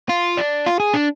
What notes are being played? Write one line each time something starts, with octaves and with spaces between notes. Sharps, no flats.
F4
D4
F4
G#4
D4